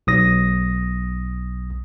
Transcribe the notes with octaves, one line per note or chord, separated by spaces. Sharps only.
B1 D#6 A#6